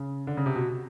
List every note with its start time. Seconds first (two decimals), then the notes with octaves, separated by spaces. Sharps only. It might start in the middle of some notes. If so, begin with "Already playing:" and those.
Already playing: C#3
0.27 D3
0.37 C#3
0.46 C3
0.56 B2